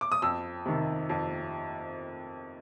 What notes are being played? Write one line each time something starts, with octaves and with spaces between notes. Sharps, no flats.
D6
D#6
F2 E6
C3 D#3
F2